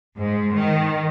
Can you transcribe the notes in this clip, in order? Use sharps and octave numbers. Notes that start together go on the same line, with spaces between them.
G#2
D#3